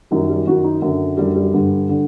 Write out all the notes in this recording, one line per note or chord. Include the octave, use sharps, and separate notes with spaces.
F#2 D#3 G3
G3
F#2 D#3 F#4
D#4
F#2 D3
F#2 D3 G3
G3
G2 D3
D3